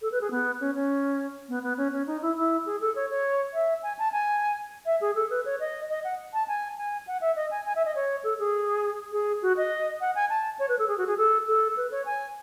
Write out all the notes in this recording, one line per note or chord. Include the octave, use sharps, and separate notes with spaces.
A4
B4
G#4
B3
C#4
C#4
B3
B3
C#4
C#4
D#4
E4
E4
G#4
A4
C#5
C#5
E5
G#5
A5
G#5
E5
G#4
A4
B4
C#5
D#5
D#5
F#5
A5
G#5
G#5
F#5
E5
D#5
G#5
G#5
E5
D#5
C#5
A4
G#4
G#4
F#4
D#5
F#5
G#5
A5
C#5
B4
A4
G#4
F#4
G#4
A4
A4
B4
C#5
G#5